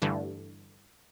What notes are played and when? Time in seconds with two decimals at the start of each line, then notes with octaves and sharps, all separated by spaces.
0.02 G2 D3 E3 A3